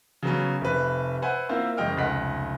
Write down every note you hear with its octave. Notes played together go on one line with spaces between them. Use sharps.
C#3 F#3 B3 C#4
F1 C3 B4
B4 C5 E5 F#5 G#5
A#3 C4 E4 F4 C5
F#1 G#3 D#5 G5 F6
F1 C#2 D#5 F#5 B6